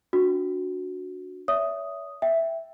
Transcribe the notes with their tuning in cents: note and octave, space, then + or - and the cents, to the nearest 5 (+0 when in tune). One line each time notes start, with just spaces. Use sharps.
D4 -15 F#4 -15
C#5 +35 E5 +0 D#6 +0
E5 +0 G5 +0